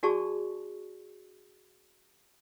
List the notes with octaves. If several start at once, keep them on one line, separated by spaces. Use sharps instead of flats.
D4 F#4 G#4 D5 A5 C#6